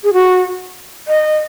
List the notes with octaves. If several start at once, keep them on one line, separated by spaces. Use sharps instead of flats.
G#4
F#4
D#5